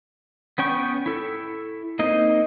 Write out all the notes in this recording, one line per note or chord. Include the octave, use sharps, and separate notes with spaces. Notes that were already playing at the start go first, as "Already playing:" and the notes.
B3 C#4 G5 C#6 G6
E4 A4
A#3 C4 D#4 D#5